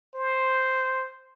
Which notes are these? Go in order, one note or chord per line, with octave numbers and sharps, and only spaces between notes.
C5